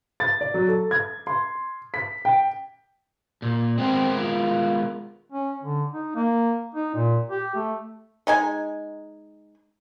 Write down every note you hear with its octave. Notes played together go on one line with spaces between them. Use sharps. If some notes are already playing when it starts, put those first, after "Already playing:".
A6
D5
F#3
A4
G#6
C6
B6
G5
A#2
G#3 B3 C4 A#4
F4
C#4
D3
D#4
A#3
D#4
A#2
G4
A3
G#3 D#4 G#5